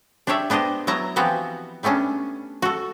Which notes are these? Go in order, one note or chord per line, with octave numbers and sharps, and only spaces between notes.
D4 G4 C#5 D5 E5
B3 D4 G4 C5 D#5
F#3 B3 E4 A5 A#5
E3 F3 B3 C4 F#4 G4
G3 A3 B3 C#4 D4
F#4 A4